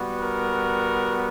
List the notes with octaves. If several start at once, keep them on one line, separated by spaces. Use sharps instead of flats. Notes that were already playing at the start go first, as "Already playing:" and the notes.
Already playing: G3 B3 F#4
A#4